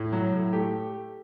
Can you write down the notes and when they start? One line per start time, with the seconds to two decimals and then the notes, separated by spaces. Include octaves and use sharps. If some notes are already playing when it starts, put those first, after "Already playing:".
Already playing: A2
0.12 F#3
0.32 A2
0.53 A3 G4